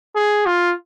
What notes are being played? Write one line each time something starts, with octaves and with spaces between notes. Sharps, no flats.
G#4
F4